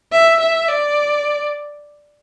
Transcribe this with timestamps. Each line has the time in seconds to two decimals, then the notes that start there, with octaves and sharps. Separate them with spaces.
0.12 E5
0.40 E5
0.68 D5